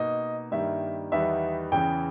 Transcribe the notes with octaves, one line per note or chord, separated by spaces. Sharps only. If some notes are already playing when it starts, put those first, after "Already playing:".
Already playing: B2 A#3 D#4 D#5
G2 D#3 G3 A#3 E5
E2 D#3 G3 B3 E5
E2 C#3 E3 G5